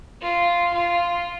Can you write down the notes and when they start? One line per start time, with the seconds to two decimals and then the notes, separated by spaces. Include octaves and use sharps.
0.21 F4
0.73 F4